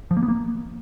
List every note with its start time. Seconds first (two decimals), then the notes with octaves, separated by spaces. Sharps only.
0.11 F3
0.17 A#3
0.23 B3
0.28 A#3